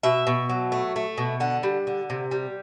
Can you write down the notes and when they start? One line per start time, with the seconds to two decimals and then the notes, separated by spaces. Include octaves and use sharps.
0.03 B2 E5
0.27 B2
0.49 F#3
0.72 A3
0.96 A3
1.18 B2
1.40 D3 F#5
1.63 G3
1.87 D3
2.10 C3
2.31 G3